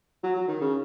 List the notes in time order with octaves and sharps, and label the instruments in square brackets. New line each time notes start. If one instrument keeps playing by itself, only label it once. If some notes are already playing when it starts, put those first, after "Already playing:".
[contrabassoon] F#3
F#3
D#3
C#3